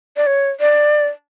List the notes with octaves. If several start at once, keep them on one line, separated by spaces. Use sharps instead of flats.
D5
C#5
D5